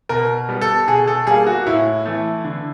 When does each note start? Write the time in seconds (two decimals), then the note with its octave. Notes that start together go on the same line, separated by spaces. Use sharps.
0.09 B2 A#4
0.49 G3 B3
0.61 A4
0.87 B2 G#4
1.08 A4
1.27 G3 A#3 G#4
1.47 F#4
1.67 A2 E4
2.06 E3 A3
2.45 D3